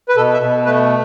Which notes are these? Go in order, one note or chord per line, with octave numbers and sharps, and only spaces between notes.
B4
B2 A4
E5
B2
A3 B4